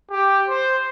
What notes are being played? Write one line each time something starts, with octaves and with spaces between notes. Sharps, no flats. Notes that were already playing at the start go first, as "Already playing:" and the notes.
G4
C5